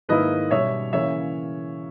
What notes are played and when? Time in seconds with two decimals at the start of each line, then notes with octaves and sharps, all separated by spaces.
0.09 G#2 D#3 A#3 E4 B4 D#5
0.51 B2 G3 C#4 C#5 E5
0.93 C#3 E3 A#3 C#5 E5